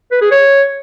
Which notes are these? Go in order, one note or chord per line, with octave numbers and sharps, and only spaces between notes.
B4
G#4
C#5